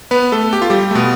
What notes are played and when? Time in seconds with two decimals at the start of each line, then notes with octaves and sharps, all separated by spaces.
0.11 B3 B4
0.32 A3 A4
0.53 G4
0.62 F4
0.70 G3 G4
0.91 A3
0.95 B2 B3